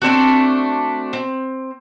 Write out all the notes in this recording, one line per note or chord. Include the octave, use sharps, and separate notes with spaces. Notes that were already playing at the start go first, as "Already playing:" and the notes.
A3 C4 D4 F#4
C4